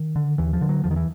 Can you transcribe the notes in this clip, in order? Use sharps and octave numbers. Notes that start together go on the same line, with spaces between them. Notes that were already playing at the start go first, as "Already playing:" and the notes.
Already playing: D#3
D3
D#2 E3
F3
D3
F#3
E2 F3
D#3
E3